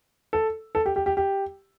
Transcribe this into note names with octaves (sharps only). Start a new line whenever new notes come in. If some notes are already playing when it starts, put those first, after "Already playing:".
A4
A4
G4
G4
G4
G4